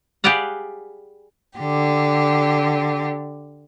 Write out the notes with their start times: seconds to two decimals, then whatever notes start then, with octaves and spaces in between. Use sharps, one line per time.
0.24 G4 G#4 B4 D5 F5 F#5
1.57 D3 G4